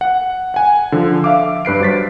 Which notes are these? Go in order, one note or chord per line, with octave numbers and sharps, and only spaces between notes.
F#5
F#5 G#5
D3 F3
E5 F5 D6
G2 B4 C7 D7
F#3 C5 A6 B6